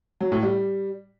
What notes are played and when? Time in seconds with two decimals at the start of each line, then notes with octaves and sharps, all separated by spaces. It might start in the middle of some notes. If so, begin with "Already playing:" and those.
0.21 F#3
0.32 A2
0.43 G3